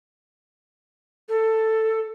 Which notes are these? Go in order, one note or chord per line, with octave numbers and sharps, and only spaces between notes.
A4